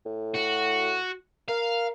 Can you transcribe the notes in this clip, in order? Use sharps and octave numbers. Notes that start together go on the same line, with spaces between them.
A2
F#4
A#4 F5